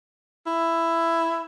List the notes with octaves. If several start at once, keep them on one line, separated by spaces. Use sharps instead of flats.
E4